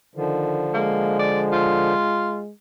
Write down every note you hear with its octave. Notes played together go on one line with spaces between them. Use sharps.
D3 D#3 F3
G#3 A#3
D5
F4